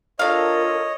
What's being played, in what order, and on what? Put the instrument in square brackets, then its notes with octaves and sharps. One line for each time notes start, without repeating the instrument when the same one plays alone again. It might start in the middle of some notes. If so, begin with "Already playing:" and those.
[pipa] D4 F5 [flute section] F4 A4 A#4 [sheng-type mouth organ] C#5 D#5